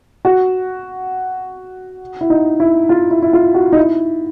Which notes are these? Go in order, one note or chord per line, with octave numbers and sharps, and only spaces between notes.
F#4
E4
D#4
E4
F4
E4
E4
F4
F#4
D#4
E4